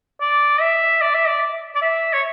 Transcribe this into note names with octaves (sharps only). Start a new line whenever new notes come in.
D5
E5
D5
E5
D5
D5
E5
C#5